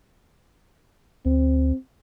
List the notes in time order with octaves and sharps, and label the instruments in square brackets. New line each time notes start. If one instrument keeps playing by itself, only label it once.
[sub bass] D2 [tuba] C4